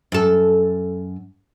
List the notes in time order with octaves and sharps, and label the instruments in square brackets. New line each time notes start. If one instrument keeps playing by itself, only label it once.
[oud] F#2 A4